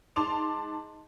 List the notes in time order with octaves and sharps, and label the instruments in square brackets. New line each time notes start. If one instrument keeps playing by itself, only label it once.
[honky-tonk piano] G#2 A5 C6 D6 F7